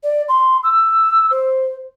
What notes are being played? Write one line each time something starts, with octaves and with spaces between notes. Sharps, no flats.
D5
C6
E6
C5